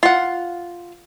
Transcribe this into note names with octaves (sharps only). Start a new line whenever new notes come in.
F4 F#5